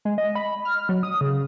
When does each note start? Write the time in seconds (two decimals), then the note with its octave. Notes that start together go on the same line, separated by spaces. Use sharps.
0.05 G#3
0.18 D#5
0.35 B5
0.65 F6
0.89 F#3
1.03 D#6
1.21 C#3